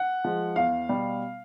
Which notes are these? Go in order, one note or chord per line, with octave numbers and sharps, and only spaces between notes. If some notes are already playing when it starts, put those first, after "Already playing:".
Already playing: F#5
F3 G#3
E2 F5
B2 G3